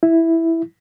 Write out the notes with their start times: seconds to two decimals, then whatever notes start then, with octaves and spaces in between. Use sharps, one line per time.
0.03 E4